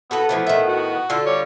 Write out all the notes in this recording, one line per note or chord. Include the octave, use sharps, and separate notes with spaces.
B3 F#4 A4 B4
E3 F3 A3
A2 D#3 E5
F#4
D3 F4 A4
G3 C#5